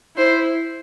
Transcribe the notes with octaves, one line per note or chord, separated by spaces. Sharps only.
E4 C5